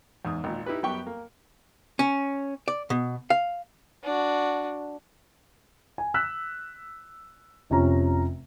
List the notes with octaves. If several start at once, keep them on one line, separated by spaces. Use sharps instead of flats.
E2 G#2 D#6
G#1 A#2
D#4 E4 G4 B4
F#2 G3 B3 G4 G5 C#6
A#3
C#4
D5
B2
F5
D4 F#4
G#5
E6 F#6 B6
F1 C3 F3 C#4 A#5